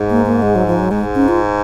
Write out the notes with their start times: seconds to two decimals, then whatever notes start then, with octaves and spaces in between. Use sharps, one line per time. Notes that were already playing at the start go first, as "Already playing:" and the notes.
Already playing: G#2
0.10 A#3
0.26 A#3
0.42 G#3
0.55 F#3
0.67 F3
0.79 F#3
0.91 G#2 G#3
1.15 C#4
1.28 F4